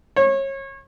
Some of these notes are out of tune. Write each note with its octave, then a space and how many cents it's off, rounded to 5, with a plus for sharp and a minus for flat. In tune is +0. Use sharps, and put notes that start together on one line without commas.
C#5 -30